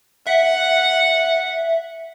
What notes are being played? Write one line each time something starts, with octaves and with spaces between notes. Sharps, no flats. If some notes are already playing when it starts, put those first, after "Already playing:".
E5 F#5